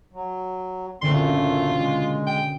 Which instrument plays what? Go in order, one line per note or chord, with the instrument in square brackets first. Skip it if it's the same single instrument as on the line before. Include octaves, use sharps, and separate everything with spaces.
[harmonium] F#3
[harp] C#2 A#2 D3 [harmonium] F#2 A3 C4 [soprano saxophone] C6
[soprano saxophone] F4 [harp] F#4
[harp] B1 B2 [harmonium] G#3
[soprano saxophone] G5